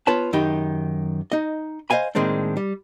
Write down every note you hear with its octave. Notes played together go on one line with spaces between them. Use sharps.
B3 F4 B4 C#5 A5
F#2 D#3 D#4 G4 B5
D#4 D#5
C5 D#5 F5 G#5 B5
A2 D#3 G#3 A#3 C4 D4
G3